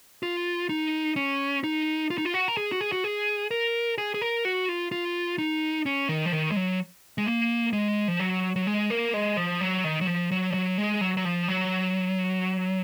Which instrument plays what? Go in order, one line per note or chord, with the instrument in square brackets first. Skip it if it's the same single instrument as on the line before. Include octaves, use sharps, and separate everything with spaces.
[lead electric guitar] F4
D#4
C#4
D#4
F4
D#4
F4
F#4
A#4
G#4
F#4
G#4
F#4
G#4
A#4
G#4
G#4
A#4
F#4
F4
F4
D#4
C#4
D#3
F3
D#3
G#3
F#3
G#3
A#3
G#3
F3
F#3
F#3
G#3
A#3
G#3
F3
F#3
D#3
F#3
F3
F#3
F3
F#3
G#3
F#3
F#3
F3
F#3